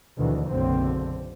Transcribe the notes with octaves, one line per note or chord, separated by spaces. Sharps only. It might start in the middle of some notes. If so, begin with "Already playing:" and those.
D2 B2 D#3 E3
F#1 B1 B2 D3 C4